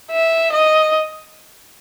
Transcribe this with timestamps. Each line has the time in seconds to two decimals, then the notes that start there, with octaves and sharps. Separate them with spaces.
0.12 E5
0.53 D#5